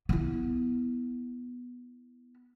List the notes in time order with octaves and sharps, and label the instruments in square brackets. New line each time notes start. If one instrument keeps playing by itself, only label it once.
[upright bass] B3 E4